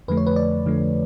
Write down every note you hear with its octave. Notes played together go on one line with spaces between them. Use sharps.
F2 D3 F3 A3 B4
C#5
B4
D5
F2 D3 F3 A3